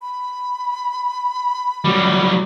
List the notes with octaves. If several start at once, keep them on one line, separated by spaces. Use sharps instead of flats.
B5
F#3 G3